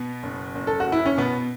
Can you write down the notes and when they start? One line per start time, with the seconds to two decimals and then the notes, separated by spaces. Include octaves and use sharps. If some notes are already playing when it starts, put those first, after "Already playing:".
Already playing: B2 B3
0.23 F#1
0.55 F#1
0.67 A4
0.80 F#4
0.87 F#1
0.92 E4
1.06 C#4
1.18 B2 B3